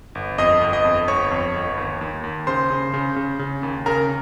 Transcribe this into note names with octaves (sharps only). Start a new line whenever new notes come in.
G1
F2 D#5 D#6
G1
D#5 D#6
F2
G1 C#5 C#6
F2
G1
D#2
D#2
D#2
C#3 C5 C6
C#3
C#3
C#3
C#3
D#2
C#3 A#4 A#5